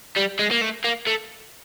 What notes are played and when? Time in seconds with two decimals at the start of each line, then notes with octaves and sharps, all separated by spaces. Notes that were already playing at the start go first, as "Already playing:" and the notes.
0.16 G3
0.39 G#3
0.51 A#3
0.62 A3
0.85 A#3
1.07 A3